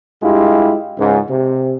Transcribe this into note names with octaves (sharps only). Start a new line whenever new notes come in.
G2 G#3 E4 F4 G4
C#2 G#2
C3